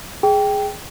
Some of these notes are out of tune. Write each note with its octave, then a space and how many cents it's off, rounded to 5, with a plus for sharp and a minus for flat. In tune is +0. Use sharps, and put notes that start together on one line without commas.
G#4 +0 G5 +0